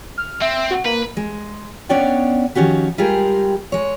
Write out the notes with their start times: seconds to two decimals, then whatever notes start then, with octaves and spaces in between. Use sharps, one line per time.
0.18 F6
0.42 C4 E5
0.71 F#4
0.85 A#3 B4
1.17 G#3
1.89 B3 C#4 D4 C#5 D5 G5
2.55 D#3 F3 C#4 F#4 G4
2.98 G3 G#3 F4 G4 G#4 A#4
3.72 G#3 C#5